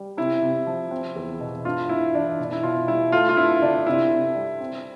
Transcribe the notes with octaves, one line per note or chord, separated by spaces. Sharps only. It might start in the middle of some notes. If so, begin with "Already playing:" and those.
Already playing: G3
C3 E4
C3
F3
C4
E2
B2
G2 F4
G2 E4
E3 D4
B2
E4
B2 F4
G3 E4
A3 F4
F4
G2 E4
D3 D4
C3 E4
C3
G3
C4